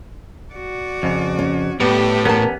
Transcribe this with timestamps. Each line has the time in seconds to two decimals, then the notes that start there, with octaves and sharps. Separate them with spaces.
0.53 F#4 D5
1.03 F2 C#3
1.39 C#4
1.80 A2 G3 B3 G4
2.25 E2 B3 C#4 A#4 A5